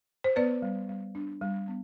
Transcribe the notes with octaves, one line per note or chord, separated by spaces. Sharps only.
C5
B3 B4 D5
G3
G3
D4
G3
B3